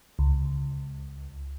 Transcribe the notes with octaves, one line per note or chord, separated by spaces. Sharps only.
C#2